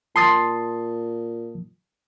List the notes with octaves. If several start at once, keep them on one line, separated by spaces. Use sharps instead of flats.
A#2 A5 C6 D#6 A6